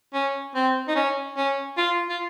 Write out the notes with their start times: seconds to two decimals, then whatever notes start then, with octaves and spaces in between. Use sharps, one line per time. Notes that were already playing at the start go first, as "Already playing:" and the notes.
0.14 C#4
0.55 C4
0.88 D#4
0.95 C#4
1.37 C#4
1.78 F4
2.10 F4